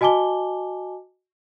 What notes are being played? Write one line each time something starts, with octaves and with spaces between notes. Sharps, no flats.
F#4 D#5 G#5 A5 D6 G7